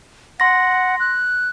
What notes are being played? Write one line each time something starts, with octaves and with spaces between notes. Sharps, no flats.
F#5 C6 A#6
F#6